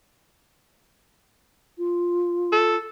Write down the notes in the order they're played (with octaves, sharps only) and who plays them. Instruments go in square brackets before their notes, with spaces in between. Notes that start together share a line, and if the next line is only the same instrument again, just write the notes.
[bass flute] F4
[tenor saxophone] A4